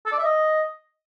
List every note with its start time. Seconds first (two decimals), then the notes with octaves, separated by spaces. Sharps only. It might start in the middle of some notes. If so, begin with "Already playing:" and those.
0.06 A4
0.12 D5
0.19 E5
0.25 D#5